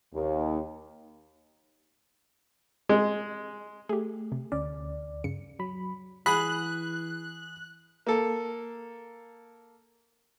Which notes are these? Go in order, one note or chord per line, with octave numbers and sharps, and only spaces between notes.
D#2
G#3
A3 G4 G#4
C3
D2 C#4 D5
G2 C#3 C#7
F#3 B5
E3 G#4 B5 F#6
A#3 A4